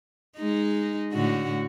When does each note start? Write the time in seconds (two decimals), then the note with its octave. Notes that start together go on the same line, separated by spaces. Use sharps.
0.38 G#3 D#4
1.13 A2 D3 F#4